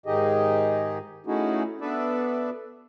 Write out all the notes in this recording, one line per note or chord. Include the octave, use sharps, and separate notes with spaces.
G#2 D#3 D#4 G4 G#4 D#5
A3 C#4 D#4 E4 F#4 G#4
B3 D4 A4 B4 D5 E5